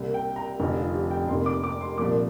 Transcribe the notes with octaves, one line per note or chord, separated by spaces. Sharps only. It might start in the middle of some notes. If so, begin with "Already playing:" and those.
Already playing: C2 C3 A#3
G5
A#5
F1 F2 D3 F3 G4
F4
G4
G5
F1 F2 C3 A#3 C6
D6
D6
C6
C2 A#2 F3 A#3 D6